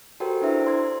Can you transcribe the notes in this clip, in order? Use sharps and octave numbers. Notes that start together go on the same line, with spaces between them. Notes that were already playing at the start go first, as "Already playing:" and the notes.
F#4 G4 A4 A#4 C5 G5
D4 E4 B4 C5 E5
C6 G#6